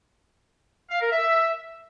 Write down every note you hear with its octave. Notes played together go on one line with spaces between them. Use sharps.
F5
A#4
E5